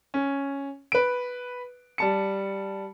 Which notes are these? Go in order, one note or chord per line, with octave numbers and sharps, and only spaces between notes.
C#4
B4 D7
G3 A5 C#7